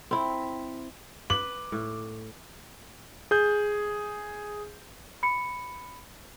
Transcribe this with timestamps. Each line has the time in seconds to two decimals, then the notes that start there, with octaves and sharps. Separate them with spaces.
0.11 C4 E4
1.30 B4 D6 F#7
1.72 A2
3.31 G#4 G6
5.23 B5 C#7